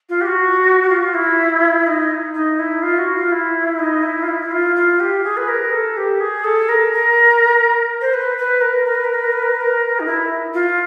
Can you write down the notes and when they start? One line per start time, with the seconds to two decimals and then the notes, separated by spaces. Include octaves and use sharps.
0.09 F4
0.21 G4
0.26 F#4
0.89 F4
1.14 E4
1.87 D#4
2.34 D#4
2.59 E4
2.82 F4
2.98 F#4
3.15 F4
3.31 E4
3.79 D#4
4.03 E4
4.22 F4
4.28 E4
4.41 E4
4.51 F4
4.76 F4
5.00 G4
5.24 G#4
5.37 B4
5.48 A#4
5.72 A4
5.97 G4
6.20 G#4
6.44 A4
6.68 A#4
6.93 A#4
8.01 C5
8.13 B4
8.37 B4
8.61 A#4
8.85 A#4
8.95 B4
9.04 A#4
9.14 B4
9.24 A#4
9.32 B4
9.43 A#4
9.52 B4
9.60 A#4
9.99 D#4
10.06 E4
10.54 F4